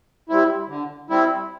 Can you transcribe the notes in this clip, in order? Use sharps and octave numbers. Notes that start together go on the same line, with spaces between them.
G3 C4 E4
D3
G3 C4 E4